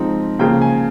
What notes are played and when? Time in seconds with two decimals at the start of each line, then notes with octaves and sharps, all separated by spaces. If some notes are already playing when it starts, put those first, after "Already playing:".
Already playing: F3 G#3 C4 D#4
0.39 C#3 F3 A#3 G5
0.62 G#5